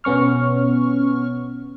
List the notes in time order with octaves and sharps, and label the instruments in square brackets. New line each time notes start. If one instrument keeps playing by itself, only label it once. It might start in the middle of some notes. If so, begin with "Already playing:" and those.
[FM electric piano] B2 B3 C#4 C#6 F6